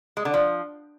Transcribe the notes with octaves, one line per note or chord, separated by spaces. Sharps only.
G#3
D3
F3